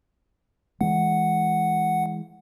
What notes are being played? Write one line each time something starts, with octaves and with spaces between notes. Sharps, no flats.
E3 G#3 F#5